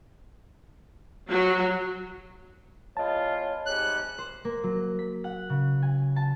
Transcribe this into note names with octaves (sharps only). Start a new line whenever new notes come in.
F#3
E2 F4 B4 C#5 D#5 A5
G#2 C3 G3 F#6
C5
A#3
F#3
B6
F#5
C#3
G#5
A5